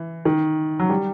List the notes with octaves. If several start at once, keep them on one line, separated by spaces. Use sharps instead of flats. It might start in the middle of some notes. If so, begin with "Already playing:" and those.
Already playing: E3
D#3
F#3
G3